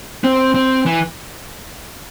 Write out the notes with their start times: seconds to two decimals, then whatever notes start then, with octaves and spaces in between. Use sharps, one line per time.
0.24 C4
0.54 C4
0.86 E3